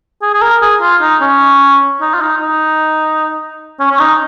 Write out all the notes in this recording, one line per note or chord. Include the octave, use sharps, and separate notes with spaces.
G#4
G#4
A#4
G#4
F4
D#4
C#4
D#4
F4
D#4
D#4
C#4
C#4
D#4